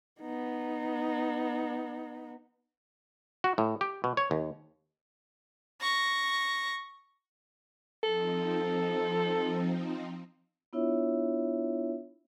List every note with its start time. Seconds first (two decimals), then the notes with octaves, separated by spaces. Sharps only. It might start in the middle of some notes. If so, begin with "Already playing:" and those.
0.20 B3 D#4
3.44 F#4
3.58 A2
3.81 G4
4.04 B2
4.17 C#5
4.31 D#2
5.81 C#6 A#6
8.03 F3 C4 D#4 A4
10.73 B3 D4 E4 F4 C#5 E5